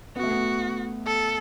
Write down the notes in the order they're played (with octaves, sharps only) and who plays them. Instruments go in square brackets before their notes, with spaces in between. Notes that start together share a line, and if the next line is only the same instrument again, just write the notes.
[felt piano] B3 [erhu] F#4
[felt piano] A3
B3
[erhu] A4